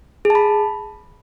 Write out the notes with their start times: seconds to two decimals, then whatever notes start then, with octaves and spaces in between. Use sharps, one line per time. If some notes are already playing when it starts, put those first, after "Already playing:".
0.25 G#4
0.30 A5
0.35 B5